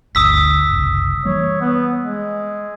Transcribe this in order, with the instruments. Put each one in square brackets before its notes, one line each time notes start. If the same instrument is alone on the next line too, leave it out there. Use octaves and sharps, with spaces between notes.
[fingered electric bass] G1 D2 D3 [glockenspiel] D#6 E6 B6
[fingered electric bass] F#1 C2
[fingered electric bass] E3 G3 A#3 [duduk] C#5
[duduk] B3
G#3